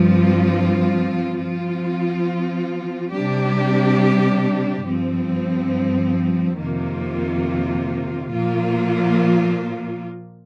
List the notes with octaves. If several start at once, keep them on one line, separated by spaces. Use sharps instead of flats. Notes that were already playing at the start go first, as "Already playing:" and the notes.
Already playing: G2 F3 C4 F4
F3 C4 F4
C3 G3 D4 G4
G2 F3 C4
F2 C3 D#3 A#3 F4
A#2 F3 A#3 F4